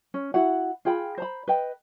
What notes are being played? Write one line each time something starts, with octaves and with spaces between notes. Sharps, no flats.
C#4
E4 F#4 F#5
F4 G#4 G5 B5
C5 A#5 B5
B4 D#5 G5